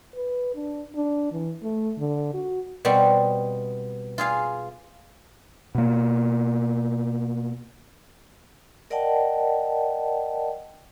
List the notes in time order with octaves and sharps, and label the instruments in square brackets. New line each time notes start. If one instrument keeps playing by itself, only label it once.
[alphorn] B4
D4
D4
E3
A3
D3
F#4
[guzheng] B2 G3 B3 C4
F4 G#4 F5
[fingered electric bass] B2 A#3
[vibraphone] A#4 D5 D#5 F#5 G5 A5